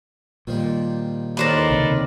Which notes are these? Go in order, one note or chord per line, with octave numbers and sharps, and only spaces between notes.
A#2 D#3 F3 G3
D#2 A2 D#3 B4 C5 D5 A#5
C#2 C3 C4